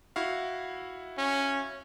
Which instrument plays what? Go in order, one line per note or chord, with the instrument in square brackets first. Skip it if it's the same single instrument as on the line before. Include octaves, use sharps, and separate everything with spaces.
[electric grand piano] E4 F#4 F5
[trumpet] C#4